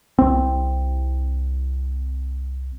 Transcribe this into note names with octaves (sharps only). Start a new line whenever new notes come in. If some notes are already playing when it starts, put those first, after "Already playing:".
C2 C4